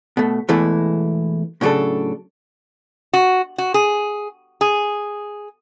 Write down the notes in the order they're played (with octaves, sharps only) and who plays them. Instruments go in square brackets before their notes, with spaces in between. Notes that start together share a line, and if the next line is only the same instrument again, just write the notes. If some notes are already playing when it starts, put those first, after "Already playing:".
[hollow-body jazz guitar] B2 A3
E2 B2 E3 G#3 A3 E4
A2 C#3 F#3 D4 A4
[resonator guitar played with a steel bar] F#4
F#4
G#4
G#4